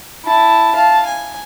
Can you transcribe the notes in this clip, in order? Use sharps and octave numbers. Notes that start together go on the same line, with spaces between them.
E4 A5
F5 A5
G#5